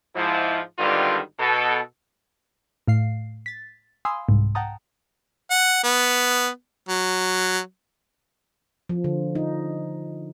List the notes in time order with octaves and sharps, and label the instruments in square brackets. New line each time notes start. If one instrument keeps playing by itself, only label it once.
[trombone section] G#2 F3 E4
G#1 D3 D#3 G3 F4 B4
B2 A4
[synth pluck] A2 F5 C7
A6 B6
F5 G#5 B5 C6 D#6 E6
C2 G#2
F#5 G5 A5 A#5 D#6
[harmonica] F#5
B3
F#3
[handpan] F3
D3
D#4